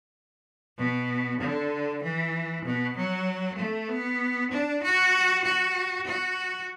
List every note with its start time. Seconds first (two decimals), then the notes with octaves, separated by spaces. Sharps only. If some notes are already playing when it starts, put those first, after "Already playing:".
0.78 B2
1.41 D3
2.03 E3
2.65 B2
2.96 F#3
3.58 A3
3.89 B3
4.51 D4
4.83 F#4
5.44 F#4
6.07 F#4